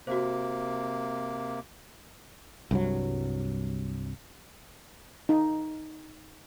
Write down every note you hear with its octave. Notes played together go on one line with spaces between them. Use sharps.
C3 A#3 F#4 C5
C2 G2 F#3
D#4